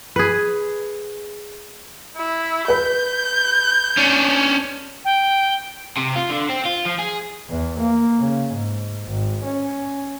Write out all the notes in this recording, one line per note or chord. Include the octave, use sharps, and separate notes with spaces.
G#4 B4
E4
B4 B5 G6
C#4 D4
G5
C3
F4
D3
C4
F4
F3
G#4
E2
A#3
C#3
G#2
G#1
C#4